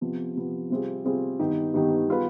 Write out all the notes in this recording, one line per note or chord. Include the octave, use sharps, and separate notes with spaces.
C3 F3 B3
C3 F3 B3
C3 G3 C4 F4 G#4
C3 G3 C4 F4 G#4
G2 D#3 B3 D#4 G4
G2 D#3 B3 D#4 G4
G3 B3 F4 G#4 B4